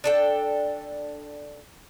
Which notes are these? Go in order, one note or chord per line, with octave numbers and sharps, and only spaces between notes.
D4 A4 G5